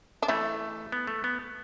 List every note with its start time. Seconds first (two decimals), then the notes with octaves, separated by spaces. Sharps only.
0.22 D4
0.28 E3 A3 E4
0.92 B3
1.07 A3
1.24 B3